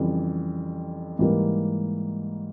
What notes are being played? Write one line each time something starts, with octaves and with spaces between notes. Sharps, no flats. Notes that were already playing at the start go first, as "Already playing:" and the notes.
Already playing: F2 C#3 E3 G3
G#2 E3 G3 A#3